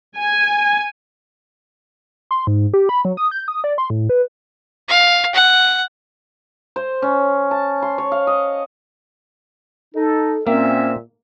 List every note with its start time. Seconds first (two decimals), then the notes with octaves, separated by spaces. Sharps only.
0.18 G#5
2.31 C6
2.47 G#2
2.74 G4
2.89 B5
3.05 F#3
3.17 D#6
3.31 G6
3.48 D#6
3.64 D5
3.78 C6
3.90 A2
4.09 B4
4.88 F5
5.34 F#5
6.76 C5
7.02 C#4
7.51 A5
7.82 C6
7.98 C#5
8.12 F5
8.27 D#5
9.95 D#4 A4
10.47 A#2 A#3 C4 C#4 E5